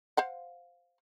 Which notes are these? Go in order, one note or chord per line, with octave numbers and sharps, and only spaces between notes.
C5 F5 F#5